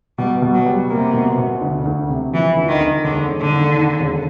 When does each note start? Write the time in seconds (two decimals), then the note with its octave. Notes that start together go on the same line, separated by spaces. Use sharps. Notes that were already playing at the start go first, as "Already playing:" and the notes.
0.18 B2 G3
0.42 B2
0.54 F#3
0.66 G3
0.90 C3 A#3
1.13 B2
1.38 B2
1.61 D2
1.85 D2
2.09 C3
2.33 E3 F3
2.56 D2
2.68 D#3
2.81 D2
3.04 E1 D3
3.28 E1
3.41 D3
3.52 D#2
3.76 D#3
4.00 E1